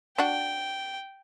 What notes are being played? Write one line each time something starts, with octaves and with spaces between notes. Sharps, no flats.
D4 F#4 G5